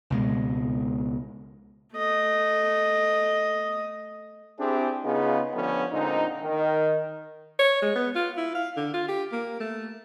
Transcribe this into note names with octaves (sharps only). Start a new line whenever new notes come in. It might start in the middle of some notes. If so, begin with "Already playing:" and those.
C#2 B2 G#3
A3 D#5
C4 D4 E4 G4 G#4
C#3 B3 D#4 F4 G#4
D3 F3 G3 A3 B3 C#4
A#2 D3 G#3 C4 D#4
D#3
C#5
G#3
B3
F4
E4
F5
D3
F4
G4
A#3
A3